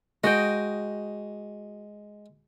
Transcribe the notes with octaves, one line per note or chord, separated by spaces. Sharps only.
G#3 F#4 D#5 G5